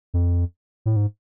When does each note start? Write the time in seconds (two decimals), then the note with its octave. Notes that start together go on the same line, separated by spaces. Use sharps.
0.14 F2
0.86 A2
0.96 G#2